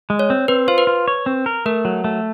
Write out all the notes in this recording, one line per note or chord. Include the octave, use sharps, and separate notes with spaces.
G#3
C#5
C4
C4 B4
F4 C5
B4
F4
C#5
C4
A#4
A3 A#4
F#3
A3